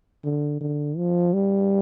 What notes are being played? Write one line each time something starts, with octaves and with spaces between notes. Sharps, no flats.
D3
D3
F3
G3